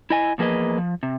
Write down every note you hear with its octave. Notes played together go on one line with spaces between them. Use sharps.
E4 D#5 G#5
E2 F3 A#3 G#4 B4 D#5
F3
C3